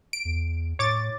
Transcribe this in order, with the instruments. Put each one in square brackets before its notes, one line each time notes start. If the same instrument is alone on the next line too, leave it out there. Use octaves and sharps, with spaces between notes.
[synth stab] D7
[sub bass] E2
[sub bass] A2 [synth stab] C#5 D6 A6